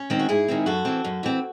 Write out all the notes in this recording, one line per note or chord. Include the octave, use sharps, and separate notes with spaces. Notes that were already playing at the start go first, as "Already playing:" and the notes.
Already playing: C#4
D#3 G#3 C4
F#4
G#2 E4 G#4
D#3 G#3 C4
F#2 F#4 A4
E3 C4
F#2
E3 C4